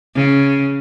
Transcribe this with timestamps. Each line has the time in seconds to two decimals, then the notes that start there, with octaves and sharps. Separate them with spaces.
0.15 C#3